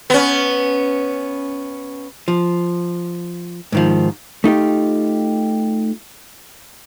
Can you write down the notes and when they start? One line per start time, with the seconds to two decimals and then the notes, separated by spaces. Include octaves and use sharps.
0.10 B3 C#4
2.28 F3
3.72 G#2 D#3 F3
4.44 A3 D#4 F4 G4